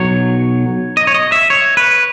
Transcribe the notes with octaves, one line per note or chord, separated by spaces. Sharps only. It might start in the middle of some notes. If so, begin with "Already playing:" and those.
Already playing: B1 F#3 C#5
D#5
C#5
D#5
E5
C#5
B4